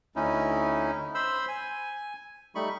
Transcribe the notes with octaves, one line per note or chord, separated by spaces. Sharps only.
D2 C#4 D#4 E4
C5 B5 C6 E6
G#5
G3 A3 D#4 B5 C#6